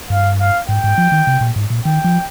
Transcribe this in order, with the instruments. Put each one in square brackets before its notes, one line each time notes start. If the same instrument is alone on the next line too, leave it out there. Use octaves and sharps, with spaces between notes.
[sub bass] G2 [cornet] F5
[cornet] F5
[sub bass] G#2 [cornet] G5
[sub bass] G#2
F3
D#3
C3
A#2
G#2
A#2
[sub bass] D#3 [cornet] G5
[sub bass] F3